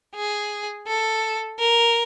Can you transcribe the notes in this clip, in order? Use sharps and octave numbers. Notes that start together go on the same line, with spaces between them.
G#4
A4
A#4